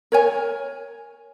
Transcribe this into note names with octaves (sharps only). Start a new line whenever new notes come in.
A#4 C#5 G#5